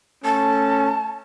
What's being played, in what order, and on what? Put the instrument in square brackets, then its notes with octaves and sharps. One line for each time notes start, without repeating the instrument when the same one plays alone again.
[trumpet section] A3 C#4 [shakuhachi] A5